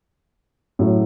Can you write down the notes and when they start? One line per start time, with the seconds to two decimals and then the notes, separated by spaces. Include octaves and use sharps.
0.79 A2 F#3 A3